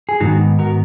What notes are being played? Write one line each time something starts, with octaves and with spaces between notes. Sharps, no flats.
G#4
G#2 D#3 G#3 B3 D#4 F#4
F#4 A#4